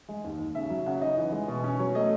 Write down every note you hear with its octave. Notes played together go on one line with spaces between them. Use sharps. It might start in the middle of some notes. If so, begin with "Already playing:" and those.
G#3
D#2
D#2
C#3 E5
F#3
C#3 F#5
D#4 D#5
E3
G#3
B2
C#4
F#3 C#5
A3 D#5